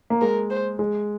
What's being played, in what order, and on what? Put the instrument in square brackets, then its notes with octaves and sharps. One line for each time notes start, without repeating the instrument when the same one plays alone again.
[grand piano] A#3
[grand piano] G#3 [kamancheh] A#4
[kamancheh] C5
[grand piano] G#3